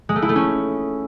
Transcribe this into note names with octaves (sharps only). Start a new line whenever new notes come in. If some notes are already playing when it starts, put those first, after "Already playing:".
G#3
A3
E4
A3
C#4